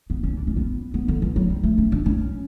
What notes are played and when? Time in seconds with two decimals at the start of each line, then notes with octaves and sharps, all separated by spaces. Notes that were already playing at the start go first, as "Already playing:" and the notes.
0.10 B3
0.23 C#4
0.38 D4
0.47 C#4
0.57 B3
0.94 B3
1.08 D3
1.22 E3
1.36 F#3
1.50 G3
1.64 A3
1.78 C#4
1.92 D4
2.06 C#4